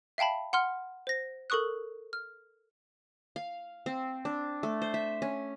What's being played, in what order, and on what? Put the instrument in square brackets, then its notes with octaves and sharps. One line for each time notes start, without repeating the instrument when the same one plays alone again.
[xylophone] E5 F5 G5 A5 B5
F#5 C6 F6
C5 A#6
A4 A#4 C#6 D#6 F#6
F6
[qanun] F5
C4
D4
A3
C5
E5
C#4